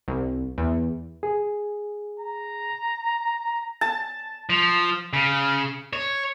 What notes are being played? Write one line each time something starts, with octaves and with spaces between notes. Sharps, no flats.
C2
E2
G#4
A#5
A5
F3
C#3
C#5